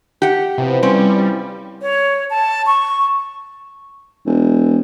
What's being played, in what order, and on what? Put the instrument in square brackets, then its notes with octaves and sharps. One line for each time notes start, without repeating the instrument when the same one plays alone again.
[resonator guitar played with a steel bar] G4 F#5
[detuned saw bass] C3 [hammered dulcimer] E3 F3 B3
[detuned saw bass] G3 [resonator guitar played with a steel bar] C4 C#4
[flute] C#5
A5
C#6
[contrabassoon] E1